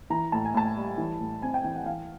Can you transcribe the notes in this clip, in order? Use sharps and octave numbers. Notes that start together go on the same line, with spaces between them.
E3 A#5
A2 A5
G#5
A2 A5
G3
E3
A2
C4 G#5
G5
E3 G5
F#5
E3 F5